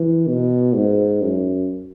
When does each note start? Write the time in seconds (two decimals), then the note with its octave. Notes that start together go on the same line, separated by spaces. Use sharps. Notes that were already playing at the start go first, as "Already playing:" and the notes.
Already playing: E3
0.27 B2
0.74 G#2
1.21 F#2